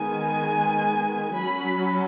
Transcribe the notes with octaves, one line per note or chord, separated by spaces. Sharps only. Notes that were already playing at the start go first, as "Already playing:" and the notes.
Already playing: D#3 G#3 B3 G#5
F#3 C#4 B5